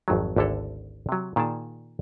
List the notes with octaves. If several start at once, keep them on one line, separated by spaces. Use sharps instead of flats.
G#1 F2 D#3 F#3
G#1 D2 D3 E4 A4 A#5
C3 F#3
A#2 D#3 G#4 D5 A5